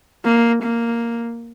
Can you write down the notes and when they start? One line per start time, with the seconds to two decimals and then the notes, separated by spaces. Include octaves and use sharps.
0.25 A#3
0.63 A#3